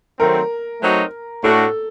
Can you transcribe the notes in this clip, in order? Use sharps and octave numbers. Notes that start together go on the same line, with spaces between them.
D#3 F#3 A3 C4 A#4
F#3 A3 C4 D#4 F#4
A2 A3 D4 F#4 A4